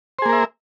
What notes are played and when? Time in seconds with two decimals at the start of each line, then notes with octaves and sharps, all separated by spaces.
0.19 C5
0.22 G#4
0.26 A#3
0.29 A#4
0.33 E5